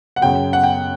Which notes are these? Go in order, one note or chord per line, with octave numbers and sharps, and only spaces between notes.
F#5
F#2 C#3 F#3 G5
F#5
G5